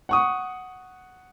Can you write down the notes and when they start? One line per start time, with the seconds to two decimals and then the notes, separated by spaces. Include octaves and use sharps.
0.09 F#5 C#6 D#6